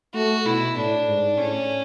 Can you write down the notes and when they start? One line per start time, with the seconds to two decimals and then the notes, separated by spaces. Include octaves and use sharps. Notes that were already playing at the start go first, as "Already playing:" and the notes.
0.14 A3 F#4
0.46 B2 E4
0.76 A2 D4
1.07 G#2
1.37 A2 C#4